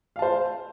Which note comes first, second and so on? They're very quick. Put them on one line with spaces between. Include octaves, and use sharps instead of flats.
F5 A5 C5